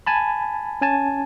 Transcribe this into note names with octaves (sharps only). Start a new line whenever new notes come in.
G#5 A5 B5
C#4 G#5 A5